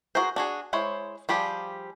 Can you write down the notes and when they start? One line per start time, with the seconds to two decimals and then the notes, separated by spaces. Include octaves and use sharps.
0.15 F#4 G#4 A#4 C5
0.36 D4 F#4 G#4
0.73 G#3 E4 C5 C#5
1.29 F3 G3 G4 G#4